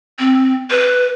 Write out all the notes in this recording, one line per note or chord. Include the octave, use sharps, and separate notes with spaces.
C4
B4